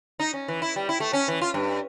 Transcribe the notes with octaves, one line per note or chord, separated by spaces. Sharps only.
D#4
C#4
E3
E4
G3
E4
A3
C#4
E3
F4
G2